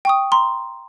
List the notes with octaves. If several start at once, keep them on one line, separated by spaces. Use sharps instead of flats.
G5 C#6 D#6
A#5 C6